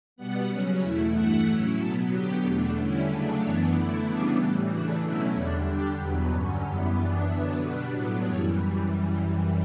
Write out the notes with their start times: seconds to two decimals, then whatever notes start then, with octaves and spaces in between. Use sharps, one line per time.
0.16 B2 G3 B3 F#5
0.49 C#3 F#3 C#4
0.81 E2 B2 A3 E4
1.13 G2 E3 A3 E4 F#5
1.45 A2 F#3 C#4 E4
1.78 B2 F#3 B3 A4
2.10 D3 F#3 B3 G4
2.42 E2 B2 A3 D4
2.75 D3 G3 C#4 E4
3.07 C#3 F#3 A3 D4 B4
3.40 F#2 E3 B3 D4 C#5
3.72 D3 A3 E4 D5
4.04 C#3 E3 G3 B3 D4 E5
4.36 A2 E3 G3 G4
4.69 C#3 E3 A3 D4 F#4
5.01 B2 F#3 A3 C#4 E4
5.33 E2 D3 G3 D4
5.66 D3 G3 D4 G4
5.98 E2 B2 F#3 B3
6.31 G2 D3 F#3 C#4
6.63 F#2 E3 G3 B3 G4
6.95 F#2 E3 B3 D4 D5
7.27 D3 F#3 B3 D4 E5
7.60 B2 G3 B3 D4 F#4
7.92 A2 F#3 B3 D4
8.24 F#2 E3 G3 C#5